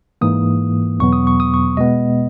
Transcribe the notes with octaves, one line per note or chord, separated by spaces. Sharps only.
G#2 E3 A#3 D#6
E2 B2 F#3 B3 C#6
D#6
C#6
D#6
C#6
B2 G#3 B3 D#5